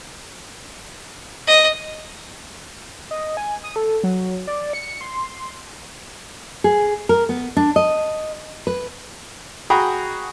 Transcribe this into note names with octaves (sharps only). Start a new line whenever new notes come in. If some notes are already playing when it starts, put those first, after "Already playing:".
D#5
D#5
G#5
D#6
A4
F#3
D5
C#7
C6
G#4
A#4
B3
D4
D#5
B4
F#4 G#4 G5 A#5 B5